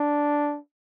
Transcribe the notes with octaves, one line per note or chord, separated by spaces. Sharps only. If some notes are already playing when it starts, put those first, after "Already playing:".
Already playing: D4